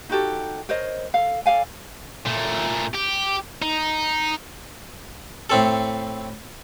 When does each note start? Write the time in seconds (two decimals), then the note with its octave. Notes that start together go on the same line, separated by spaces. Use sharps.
0.09 D#4 F#4 G4 A4
0.69 A#4 C5 C#5 D#5
1.14 A4 F5
1.46 A4 D5 F5 G#5
2.26 A#2 A3
2.95 G4
3.62 D#4
5.50 A2 C4 A4